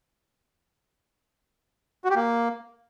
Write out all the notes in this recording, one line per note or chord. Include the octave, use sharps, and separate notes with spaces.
F#4
G4
A#3